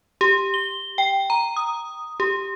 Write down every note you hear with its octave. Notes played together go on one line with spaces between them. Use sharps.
G4
G7
G5
A#5
D#6
G4